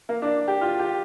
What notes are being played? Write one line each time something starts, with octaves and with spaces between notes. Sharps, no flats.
A#3
D4
G4
F4
G4